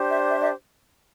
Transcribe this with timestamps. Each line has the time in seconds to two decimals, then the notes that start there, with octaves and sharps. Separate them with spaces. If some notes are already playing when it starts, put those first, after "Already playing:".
Already playing: D4 G4 C5
0.11 E5
0.30 E5
0.42 E5